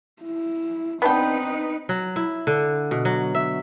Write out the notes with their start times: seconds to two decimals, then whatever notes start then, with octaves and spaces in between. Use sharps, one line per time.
0.23 E4
1.02 B3 C4 D4 D#4 B4 G5
1.89 F#3
2.16 E4
2.47 D3
2.91 B2
3.05 F#3
3.35 E5